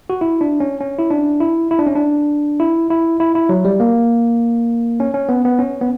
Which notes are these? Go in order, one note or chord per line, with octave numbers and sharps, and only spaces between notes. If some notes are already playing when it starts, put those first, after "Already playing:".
F#4
E4
D4
C#4
C#4
E4
D4
E4
E4
D4
C#4
D4
E4
E4
E4
E4
F#3
G3
A#3
C#4
C#4
B3
B3
C#4
B3